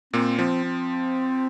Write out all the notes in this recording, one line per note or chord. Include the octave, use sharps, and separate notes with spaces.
A#2 A#3 C4
F3 C4
C4